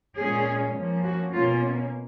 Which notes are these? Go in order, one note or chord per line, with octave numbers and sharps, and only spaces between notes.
A#2 G#3 C#4 G#4
F3 A#3 C#4
F#4
B2 A#3 C#4 F4